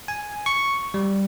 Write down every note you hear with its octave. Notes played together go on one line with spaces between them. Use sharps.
G#5
C#6
G3